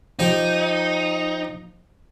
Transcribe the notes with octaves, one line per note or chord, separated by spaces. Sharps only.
F3 D#4 G4